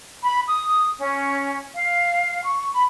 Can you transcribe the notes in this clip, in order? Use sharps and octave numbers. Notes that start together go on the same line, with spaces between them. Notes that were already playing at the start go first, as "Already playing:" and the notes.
B5
D#6
C#4
F5
C#6
B5